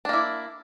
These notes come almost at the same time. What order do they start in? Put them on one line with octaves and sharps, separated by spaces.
D4 A#3 E4